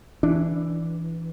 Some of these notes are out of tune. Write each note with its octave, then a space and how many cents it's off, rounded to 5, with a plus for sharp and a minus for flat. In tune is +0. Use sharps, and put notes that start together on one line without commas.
E3 +5 D4 +0